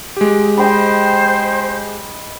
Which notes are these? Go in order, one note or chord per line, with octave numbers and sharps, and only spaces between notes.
G#3 G4
C5 D#5 G5 B5